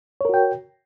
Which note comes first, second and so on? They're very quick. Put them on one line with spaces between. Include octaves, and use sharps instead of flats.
C#5 A#4 F#4 G5